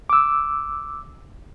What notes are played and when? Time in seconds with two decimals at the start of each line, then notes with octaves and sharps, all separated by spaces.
0.10 D6 E6